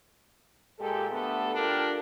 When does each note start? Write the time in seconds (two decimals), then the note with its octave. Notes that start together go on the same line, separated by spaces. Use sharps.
0.79 A#2 G#3 G4 A4
1.11 D3 A3 B3 G4 A4
1.53 D4 F4 G4 A4 A#4